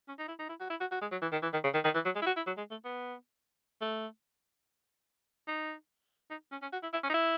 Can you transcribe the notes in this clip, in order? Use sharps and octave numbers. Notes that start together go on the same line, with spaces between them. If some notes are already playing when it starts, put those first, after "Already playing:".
C#4
D#4
E4
D#4
E4
F#4
E4
F#4
F#4
G#3
F#3
E3
D#3
E3
D#3
C#3
D#3
D#3
E3
F#3
G#3
E4
F#4
E4
F#3
G#3
A3
B3
A3
D#4
D#4
C#4
C#4
F#4
E4
E4
C#4
D#4
E4